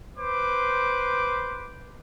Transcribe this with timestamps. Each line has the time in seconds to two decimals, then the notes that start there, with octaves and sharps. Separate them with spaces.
0.18 B4 C5 D6